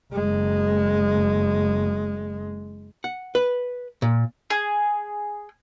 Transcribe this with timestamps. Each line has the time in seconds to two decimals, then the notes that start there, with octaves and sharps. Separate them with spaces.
0.13 F#1 G#3
3.04 F#5
3.35 B4
4.02 A#2
4.50 G#4